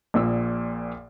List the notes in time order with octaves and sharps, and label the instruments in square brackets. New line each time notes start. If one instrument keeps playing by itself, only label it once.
[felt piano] A#1 A#2 E6